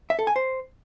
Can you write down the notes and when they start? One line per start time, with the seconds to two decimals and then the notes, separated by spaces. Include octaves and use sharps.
0.10 E5
0.19 A4
0.27 G#5
0.36 C5